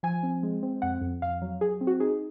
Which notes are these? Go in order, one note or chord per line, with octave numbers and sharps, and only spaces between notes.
F3 G#5
C4
G#3
C4
F2 F#5
F2
F2 F5
F#3
F#3 G#4
C4
F#4
D#4 G#4